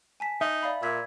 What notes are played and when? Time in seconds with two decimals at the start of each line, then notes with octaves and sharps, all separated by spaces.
0.20 G#5 A5 B6
0.41 D#4 E5
0.63 D5 F5 B5
0.83 A#2 E6 G#6 B6